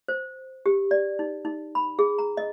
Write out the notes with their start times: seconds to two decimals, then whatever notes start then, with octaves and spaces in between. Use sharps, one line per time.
0.08 C5
0.66 G4
0.91 D5
1.19 D#4
1.45 D#4
1.75 B5
1.99 G#4
2.19 A#5
2.37 D#5